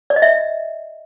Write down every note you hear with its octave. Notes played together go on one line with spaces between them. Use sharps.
D5
D#5
E5